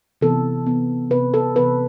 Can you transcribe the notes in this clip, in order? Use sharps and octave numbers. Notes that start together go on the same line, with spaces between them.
C3 E3 B3 A4
C3 E3 B3
C3 E3 B3 B4
A4
C3 E3 B3 B4